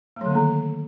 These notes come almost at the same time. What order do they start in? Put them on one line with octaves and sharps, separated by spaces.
A3 F#3 D3 A#3 D#3